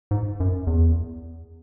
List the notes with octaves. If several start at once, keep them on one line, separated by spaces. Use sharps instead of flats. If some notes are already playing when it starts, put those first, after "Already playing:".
G#2
F#2
E2